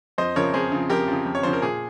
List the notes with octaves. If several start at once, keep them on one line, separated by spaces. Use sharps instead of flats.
F2 C5 D#5
C#3 F3 A#4 C#5
F2 G#4 C5
C#3 F3
F2 G4 A#4
C#3 F3
F2
C#5
C#3 F3 C5
A#4
A#2 G#4